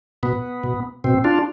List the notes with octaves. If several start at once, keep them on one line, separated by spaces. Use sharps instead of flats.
B2 B3
B2
B2 C4
D4 F4